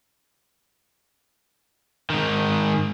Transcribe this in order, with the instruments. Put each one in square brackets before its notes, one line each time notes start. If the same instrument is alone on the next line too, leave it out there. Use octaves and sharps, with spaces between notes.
[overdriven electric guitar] G#2 D#3